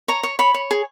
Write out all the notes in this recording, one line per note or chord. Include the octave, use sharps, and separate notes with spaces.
C#5 A#5
C#5
C#5 B5
C#5
G#4